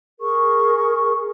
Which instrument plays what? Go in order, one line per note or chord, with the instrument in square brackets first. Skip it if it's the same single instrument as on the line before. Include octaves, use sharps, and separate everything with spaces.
[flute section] G#4 A#4 C#6